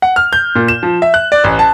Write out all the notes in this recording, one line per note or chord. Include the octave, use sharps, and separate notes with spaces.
F#5
F6
G6
A#2
E7
F3
E5
F#6
D5
A1
A5